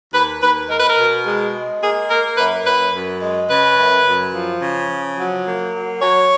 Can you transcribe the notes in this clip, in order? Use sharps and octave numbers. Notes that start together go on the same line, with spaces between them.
D#2 B4
D#2 B4
G#3 A#4
B4
A#4
B2
G#3
G#3
A#3 G#4
A#3 A#4
F#2 B4
F#2 B4
F#2
G#3
C#3 B4
F#2
F#2
F3
C#3
F3
F#3
A#3
F#3
F#3 C#5